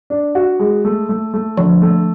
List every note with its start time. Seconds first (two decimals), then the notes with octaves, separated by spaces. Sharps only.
0.10 D4
0.35 F#4
0.59 G#3
0.85 A3
1.09 A3
1.34 A3
1.57 D3 F3
1.82 A3